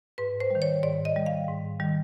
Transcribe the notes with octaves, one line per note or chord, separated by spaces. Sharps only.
G#2 B4
C5
D#3 G3
C#5
G#2 D5
D#5
D#3 G3
F5
G#2
D#3 G3